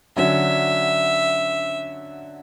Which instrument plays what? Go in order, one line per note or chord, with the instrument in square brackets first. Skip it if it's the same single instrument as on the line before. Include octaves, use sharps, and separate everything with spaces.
[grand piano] D3 F#3 C#4 [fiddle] E5